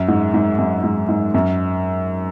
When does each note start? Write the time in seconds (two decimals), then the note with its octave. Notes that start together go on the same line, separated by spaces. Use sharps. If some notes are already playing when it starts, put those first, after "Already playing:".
Already playing: F#2
0.08 G#2
0.34 G#2
0.59 F#2
0.84 G#2
1.09 G#2
1.34 F#2